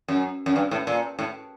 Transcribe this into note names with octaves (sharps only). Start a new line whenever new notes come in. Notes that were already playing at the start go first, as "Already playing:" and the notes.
F#2
F#2
G2
A2
A#2
A2